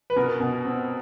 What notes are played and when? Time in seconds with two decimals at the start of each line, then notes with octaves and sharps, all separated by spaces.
0.10 B4
0.16 B2 A#4
0.40 B2
0.65 C4